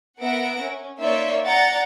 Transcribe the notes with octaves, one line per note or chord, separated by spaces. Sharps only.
B3 A#4 E5 F#5 A#6 D7
C#4
A#3 D#4 C#5 D5 E5 C6
D5 F#5 G5 A#5 A6